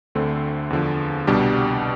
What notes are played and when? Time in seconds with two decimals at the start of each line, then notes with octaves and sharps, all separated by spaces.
0.15 D2 D3 A3 C4
0.70 E2 D3 F3
1.27 C2 B2 G3 D4 G4